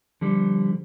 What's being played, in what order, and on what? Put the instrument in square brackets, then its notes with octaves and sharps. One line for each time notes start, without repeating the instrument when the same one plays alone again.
[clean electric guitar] D3 G3 [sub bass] F3